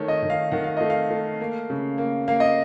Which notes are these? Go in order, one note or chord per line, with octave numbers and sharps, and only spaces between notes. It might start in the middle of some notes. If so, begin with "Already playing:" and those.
Already playing: D#3 A3 C#5
D#5
D#3
F5
D#3 F#5
F5
A3 D#5
F5
A3
A#3
C#3
A#3
A#3 F5
D#5